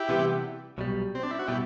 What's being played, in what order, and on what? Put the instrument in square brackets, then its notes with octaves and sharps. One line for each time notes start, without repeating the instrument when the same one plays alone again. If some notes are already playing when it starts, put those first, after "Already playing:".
Already playing: [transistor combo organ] E4 G4
[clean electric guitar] C3 E3 G3 B3
B1 B2 G3
[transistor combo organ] C4
D4
E4
F#4
[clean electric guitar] B2 G3 [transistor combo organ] E4 G4